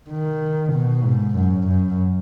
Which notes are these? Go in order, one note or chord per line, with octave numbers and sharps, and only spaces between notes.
D#3
B2
G#2
F#2
F#2